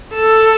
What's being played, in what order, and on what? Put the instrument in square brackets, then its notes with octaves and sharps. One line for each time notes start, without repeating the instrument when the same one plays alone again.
[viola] A4